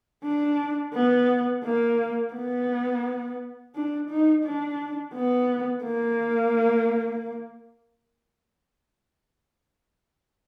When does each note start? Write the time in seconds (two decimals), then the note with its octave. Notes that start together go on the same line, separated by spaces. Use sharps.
0.24 D4
0.94 B3
1.64 A#3
2.34 B3
3.75 D4
4.10 D#4
4.44 D4
5.14 B3
5.85 A#3